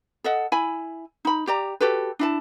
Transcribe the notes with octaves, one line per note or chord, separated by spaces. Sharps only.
A4 D#5 F#5
E4 G#5 B5
D#4 B5
G4 D5 A#5
F#4 G4 A4 B4
D4 E4 A5